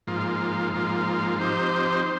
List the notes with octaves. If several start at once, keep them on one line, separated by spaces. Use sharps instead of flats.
G#2 F3 A#3 F4
G#2 F3 A#3 F4
F3 C4 D#4 G4 C5
C5